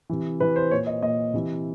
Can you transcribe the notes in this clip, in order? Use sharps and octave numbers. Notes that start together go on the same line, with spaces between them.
C3 E3
C3 E3 B4
C5
A#2 C#5
D#5
A#2 D#5
C3 E3